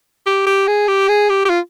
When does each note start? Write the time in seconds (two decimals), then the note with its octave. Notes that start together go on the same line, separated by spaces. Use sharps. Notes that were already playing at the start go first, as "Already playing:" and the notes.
0.26 G4
0.46 G4
0.67 G#4
0.88 G4
1.08 G#4
1.29 G4
1.45 G4
1.50 F4